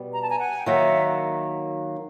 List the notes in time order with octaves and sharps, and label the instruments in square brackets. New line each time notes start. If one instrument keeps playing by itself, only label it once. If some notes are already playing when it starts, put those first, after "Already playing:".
Already playing: [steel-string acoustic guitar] B2 G3 B3
[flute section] A#5
A5
G#5 A#5
F#5 G#5
G5
[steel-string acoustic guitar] D#3 F#3 A#3 [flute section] E5 F#5